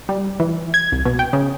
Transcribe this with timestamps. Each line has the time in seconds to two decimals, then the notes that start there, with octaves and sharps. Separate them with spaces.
0.09 G3
0.40 E3
0.74 G#6
0.92 C2
1.05 B2
1.19 G5
1.33 C#3